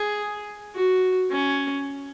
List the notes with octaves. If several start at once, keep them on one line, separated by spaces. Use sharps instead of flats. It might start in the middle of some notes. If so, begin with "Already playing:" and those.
Already playing: G#4
F#4
C#4